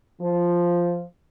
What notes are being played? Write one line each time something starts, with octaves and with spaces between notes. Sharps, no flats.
F3